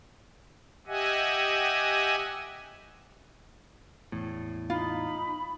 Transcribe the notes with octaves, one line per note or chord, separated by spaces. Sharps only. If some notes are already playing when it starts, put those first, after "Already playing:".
G4 D#5 E5 F#5 G#5
E2 A2
D#4 F4 B5